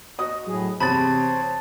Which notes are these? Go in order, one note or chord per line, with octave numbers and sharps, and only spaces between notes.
F#4 D#5 D#6
A2 F#3 G#4
E2 C3 C5 C#5 A5 B5 A6